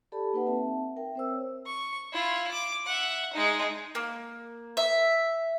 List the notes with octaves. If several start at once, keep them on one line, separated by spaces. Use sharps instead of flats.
G4 A4 D5 A5 B5
A#3 D#4 B4 F#5
C4 E5 A5
A#4 E5 G5
C4 C5 E6
C#5
C#6
E4 F4
D6
E5 F#5
G#3 D#4
A#3
E5